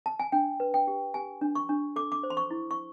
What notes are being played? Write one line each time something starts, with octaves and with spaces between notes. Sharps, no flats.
A5
G#5
D4 G5
B4
G5
G4
G4 G#5
D4
C#6
D4
A4 D6
D6
C5
C6
C#6
E4
C#6